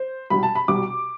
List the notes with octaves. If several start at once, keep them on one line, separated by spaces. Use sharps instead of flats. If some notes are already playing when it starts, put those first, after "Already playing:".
Already playing: C5
C2 B2 G3 B5
A5
B5
C2 B2 G3 D6